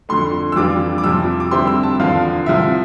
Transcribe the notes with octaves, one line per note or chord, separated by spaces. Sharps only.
F2 D3 A3 C6
E6
F2 E3 G3 D4 F4 D6
D6
F2 C3 F3 E6
D6
D3 G3 C4 E4 C6
E6
A5
E2 D3 F3 F5
C2 C3 F3 E5